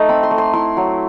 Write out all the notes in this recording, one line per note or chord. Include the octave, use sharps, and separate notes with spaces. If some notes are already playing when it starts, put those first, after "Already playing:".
Already playing: A3 D#4 D#5
C4 B5
C6
A3
C6
E4 C6
F#3